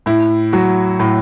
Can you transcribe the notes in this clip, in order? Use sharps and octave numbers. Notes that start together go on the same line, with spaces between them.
A2 E4
F#3 F#4
A2